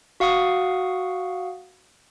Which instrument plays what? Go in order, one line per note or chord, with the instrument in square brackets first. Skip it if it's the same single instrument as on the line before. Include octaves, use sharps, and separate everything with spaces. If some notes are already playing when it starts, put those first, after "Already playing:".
[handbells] F#4 F5 F#5 C#6 D#6